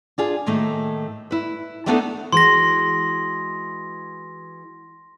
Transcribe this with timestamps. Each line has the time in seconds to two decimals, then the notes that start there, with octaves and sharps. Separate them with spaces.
0.18 D4 F4 G#4
0.46 A2 D#3 A3 A#3
1.31 E4 B4
1.86 G3 A3 B3 D4 D#4 A4
2.32 E3 G#3 F#4 C6 A#6